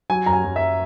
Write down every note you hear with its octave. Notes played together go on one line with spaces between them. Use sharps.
F#3 G#5
F#2 A#5
G#5
F#2
E5